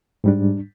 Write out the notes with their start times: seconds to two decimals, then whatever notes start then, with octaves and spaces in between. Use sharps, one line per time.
0.24 G#2 G3 D4